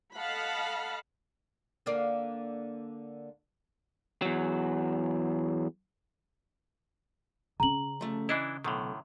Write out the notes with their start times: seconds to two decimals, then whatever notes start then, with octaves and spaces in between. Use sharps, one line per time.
0.15 A4 D#5 F5 F#5 A5 B5
1.86 D3 A#3 D5
4.22 E2 F#3
7.60 C#3 C#4 A#5 F#7
8.01 F3 A3
8.29 E3 D4 E4 D#5
8.64 B1 A2 D3 D#3